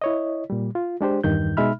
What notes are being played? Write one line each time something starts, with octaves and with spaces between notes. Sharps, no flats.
E4 C#5 D#5
A#2 G3
F4
G#3 D4 G4 C5
E2 G2 D#3 G6
B2 G#3 D#4 E5 B5 F6